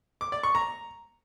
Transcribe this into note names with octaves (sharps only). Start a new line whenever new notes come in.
D6
D5
C#6
A#5